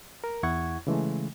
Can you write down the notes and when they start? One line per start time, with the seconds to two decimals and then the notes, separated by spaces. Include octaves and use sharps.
0.24 A#4
0.43 E2 E4 F#5 C#6 G#6
0.87 C#3 E3 G#3 A3